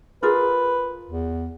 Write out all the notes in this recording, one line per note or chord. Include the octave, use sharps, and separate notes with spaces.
F4 G#4 A#4 B4
E2